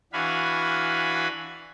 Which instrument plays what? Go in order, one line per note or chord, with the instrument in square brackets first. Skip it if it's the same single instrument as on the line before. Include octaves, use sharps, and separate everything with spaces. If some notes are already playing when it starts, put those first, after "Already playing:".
[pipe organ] E3 D4 F#4 F5 G#5 B5